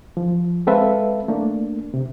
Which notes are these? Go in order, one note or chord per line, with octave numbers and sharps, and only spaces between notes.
F3
G#3 C4 A4 B4 E5 F5
A3 A#3 D4
C3